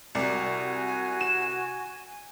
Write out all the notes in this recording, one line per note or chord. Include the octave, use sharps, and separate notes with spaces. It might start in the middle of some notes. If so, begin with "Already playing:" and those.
C2 F#4 D5 G#5
E7